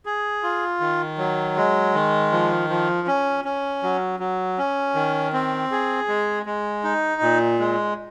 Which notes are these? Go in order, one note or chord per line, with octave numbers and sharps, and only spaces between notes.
G#4
F4
D#3
F#3
G#3
D#3
F3
F3
C#4
C#4
F#3
F#3
C#4
D#3
C4
G#4
G#3
G#3
D#4
A#2
G#3